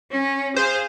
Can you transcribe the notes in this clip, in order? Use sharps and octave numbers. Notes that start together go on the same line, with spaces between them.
C#4
G#4 C5 F5